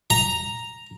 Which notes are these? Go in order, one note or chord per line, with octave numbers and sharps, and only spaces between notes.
A#5